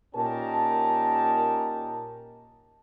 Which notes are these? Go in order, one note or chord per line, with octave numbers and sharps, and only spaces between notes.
A#2 C#4 D#4 G4 A#4 A5